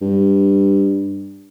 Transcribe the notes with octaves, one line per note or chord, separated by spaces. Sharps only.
G2